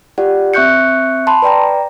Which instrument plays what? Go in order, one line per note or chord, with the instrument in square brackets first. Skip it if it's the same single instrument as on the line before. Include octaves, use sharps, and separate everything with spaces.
[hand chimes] F4 G4 D5 F#5
C4 E5 C#6 F#6 G6 C#7
A5 B5 C6
B4 D5 G5 A#5